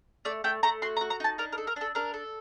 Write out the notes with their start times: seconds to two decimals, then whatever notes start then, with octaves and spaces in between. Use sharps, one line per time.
0.25 A3 D5
0.44 A3 G5
0.63 A3 A#5
0.82 F#4 C6
0.97 A#5
1.01 F#4
1.10 A#5
1.20 D#4 A5
1.38 D4 A#4
1.52 A#4
1.58 A4
1.67 A#4
1.76 D4 A4
1.95 D4 A#4
2.14 A4